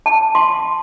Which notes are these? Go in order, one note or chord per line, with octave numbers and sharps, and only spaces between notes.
A5
C6